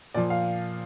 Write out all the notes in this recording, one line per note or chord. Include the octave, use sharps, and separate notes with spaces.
A#2 F3 D5
F5